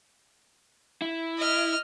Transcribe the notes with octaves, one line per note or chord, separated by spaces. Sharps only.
E4
D#5 F6